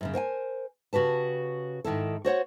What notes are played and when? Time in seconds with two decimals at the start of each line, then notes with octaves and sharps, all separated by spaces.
0.01 F#2 A2 C#3
0.14 A#4 C5 F#5 G#5
0.93 C#3 F#4 G4 B4 A5
1.84 G#2 D#3 E4 A4
2.25 F#4 C5 C#5 F#5